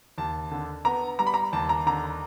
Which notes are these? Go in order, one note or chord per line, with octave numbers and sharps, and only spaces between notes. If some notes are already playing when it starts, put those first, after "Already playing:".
D#2 A5
D3
B3 A#5
G3 A#5
B5
A#5
D#2 A5
A#5
D3 A#5